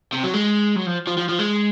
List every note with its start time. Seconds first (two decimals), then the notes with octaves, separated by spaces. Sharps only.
0.13 C3
0.24 F#3
0.34 G#3
0.76 F#3
0.86 F3
1.07 F3
1.18 F3
1.29 F3
1.39 G#3